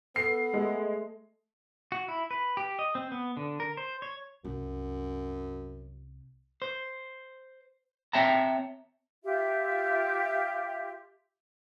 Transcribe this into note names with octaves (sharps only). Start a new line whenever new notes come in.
B3 A4 C7
G#3 A3
F#4
E4
B4
G4
D#5
C4
B3
D3
A#4
C5
C#5
C2 F#2
C5
C4 C#5 E5 G5 A5 A#5
F4 G4 E5